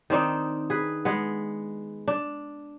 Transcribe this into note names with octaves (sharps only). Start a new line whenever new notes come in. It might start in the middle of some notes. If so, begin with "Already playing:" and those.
D#3 C4 D4 D#4
G#4 B4
G#3 B3
D4